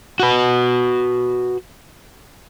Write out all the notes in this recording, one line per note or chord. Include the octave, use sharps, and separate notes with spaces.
F#4 B4